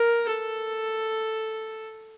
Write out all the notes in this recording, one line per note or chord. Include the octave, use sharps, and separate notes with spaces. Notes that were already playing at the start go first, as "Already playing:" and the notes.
Already playing: A#4
A4